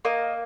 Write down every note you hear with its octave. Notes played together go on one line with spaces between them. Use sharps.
A#3 D#5